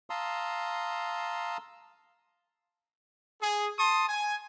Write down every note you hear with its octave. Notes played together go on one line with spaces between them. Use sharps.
F5 A5 A#5 C6 D#6 E6
G#4
A5 C6 D#6
G#5